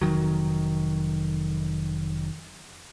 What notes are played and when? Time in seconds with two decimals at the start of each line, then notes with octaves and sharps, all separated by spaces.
0.01 F1 D#3 F#3